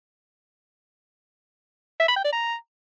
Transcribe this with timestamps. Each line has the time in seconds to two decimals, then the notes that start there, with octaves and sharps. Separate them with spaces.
2.00 E5
2.08 B5
2.16 G5
2.25 D5
2.33 A#5